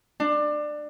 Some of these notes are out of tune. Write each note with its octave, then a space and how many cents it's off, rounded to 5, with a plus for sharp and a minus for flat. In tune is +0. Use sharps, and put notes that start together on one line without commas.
D4 +20